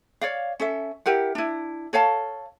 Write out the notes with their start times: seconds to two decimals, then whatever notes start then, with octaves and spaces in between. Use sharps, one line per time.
0.21 C#5 D5 F5
0.60 C#4 A4 E5
1.06 E4 G4 A#4 F#5
1.35 D4 E4
1.93 A4 C#5 F5 A5